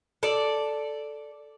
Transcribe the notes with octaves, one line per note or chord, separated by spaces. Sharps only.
A4 D5